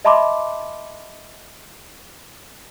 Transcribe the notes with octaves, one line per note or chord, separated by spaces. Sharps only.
D#5 E5 A5 B5 C6 D6